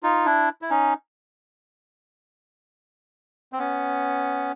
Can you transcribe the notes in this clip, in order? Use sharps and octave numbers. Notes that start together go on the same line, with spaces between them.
D#4 F4
D4 E4
E4
C#4 D#4
C4
B3 C#4